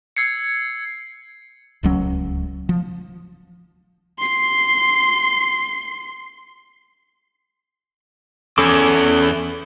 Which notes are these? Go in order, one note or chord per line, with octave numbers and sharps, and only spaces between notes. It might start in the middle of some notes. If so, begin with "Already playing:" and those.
E6 G#6 C7 C#7
D1 C#2 F#3 C#4
F3
C6 C7
E2 C#4 A4 D6